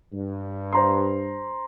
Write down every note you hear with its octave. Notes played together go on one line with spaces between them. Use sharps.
G2
C5 A#5 C6